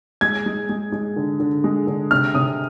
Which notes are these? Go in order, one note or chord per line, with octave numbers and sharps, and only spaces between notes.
G#3 G#6
G#3
G#3
G#3
D3
D3
G#3
D3
C3 F6
C3 D#6